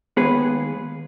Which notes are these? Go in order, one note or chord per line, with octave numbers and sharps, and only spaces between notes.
D#2 D#3 G#3 B3 G#4 B4